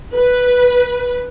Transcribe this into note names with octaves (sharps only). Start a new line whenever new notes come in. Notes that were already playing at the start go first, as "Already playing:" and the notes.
B4